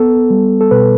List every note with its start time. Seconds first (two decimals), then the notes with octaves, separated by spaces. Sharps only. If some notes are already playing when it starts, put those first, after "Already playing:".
Already playing: B3 A4
0.30 G3
0.61 A4
0.71 B2 B4